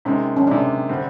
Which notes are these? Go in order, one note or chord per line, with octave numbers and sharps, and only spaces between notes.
C3 D#3 G#3 C#4
C#4
C3 D#3 G#3 D4
D3 G3 C4